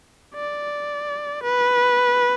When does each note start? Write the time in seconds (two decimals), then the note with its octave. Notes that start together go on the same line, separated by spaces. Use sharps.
0.35 D5
1.43 B4